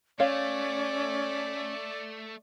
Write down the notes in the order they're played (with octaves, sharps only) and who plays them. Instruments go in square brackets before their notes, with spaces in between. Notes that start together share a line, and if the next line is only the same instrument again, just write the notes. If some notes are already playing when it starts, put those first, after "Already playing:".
[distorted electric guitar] A3 [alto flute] C#4 [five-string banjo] C#5 F5 [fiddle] D5